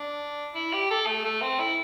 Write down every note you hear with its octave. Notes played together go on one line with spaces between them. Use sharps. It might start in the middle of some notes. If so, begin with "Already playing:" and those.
Already playing: D4
E4
G4
A4
A3
A3
C4
E4